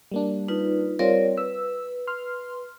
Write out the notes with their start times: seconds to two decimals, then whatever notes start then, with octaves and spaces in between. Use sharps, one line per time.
0.12 G3 A#3 D4
0.48 D#4 F4 B4
0.99 G3 C4 F4 A#4 C#5 D5
1.37 B4 E6
2.07 C6 F6